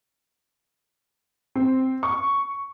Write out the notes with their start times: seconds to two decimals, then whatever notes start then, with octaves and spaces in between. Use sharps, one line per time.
1.55 C4
2.03 C#6